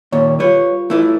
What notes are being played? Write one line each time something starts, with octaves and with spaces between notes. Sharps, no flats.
D#2 A#2 C#5
G3 F4 B4 C#5
A3 E4 B4